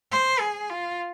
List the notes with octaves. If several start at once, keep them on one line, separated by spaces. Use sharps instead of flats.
C5
G#4
F4